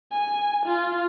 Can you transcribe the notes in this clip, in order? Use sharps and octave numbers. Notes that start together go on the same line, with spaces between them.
G#5
F4